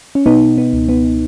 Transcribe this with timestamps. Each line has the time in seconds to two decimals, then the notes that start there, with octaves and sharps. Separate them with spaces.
0.15 C#4
0.26 B2 B3 D#4
0.58 B3
0.73 C#2
0.89 B3